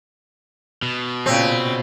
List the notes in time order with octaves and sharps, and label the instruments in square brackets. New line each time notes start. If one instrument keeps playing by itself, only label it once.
[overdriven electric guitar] B2
[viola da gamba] A#2 C#3 [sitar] C4